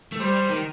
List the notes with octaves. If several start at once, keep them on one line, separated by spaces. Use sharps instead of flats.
A3
G3 C5
D#3